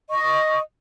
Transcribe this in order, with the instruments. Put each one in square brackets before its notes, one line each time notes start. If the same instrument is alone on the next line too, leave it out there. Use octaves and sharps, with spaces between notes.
[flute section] D#5 C#6